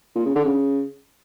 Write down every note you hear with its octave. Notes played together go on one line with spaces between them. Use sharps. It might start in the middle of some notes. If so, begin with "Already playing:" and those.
A#2
C#3
D3
C#3